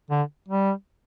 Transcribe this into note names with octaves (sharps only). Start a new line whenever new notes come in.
D3
G3